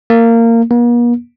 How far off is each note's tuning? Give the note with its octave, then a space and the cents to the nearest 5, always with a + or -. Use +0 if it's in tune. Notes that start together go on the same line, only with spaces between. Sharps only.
A#3 -20
A#3 +45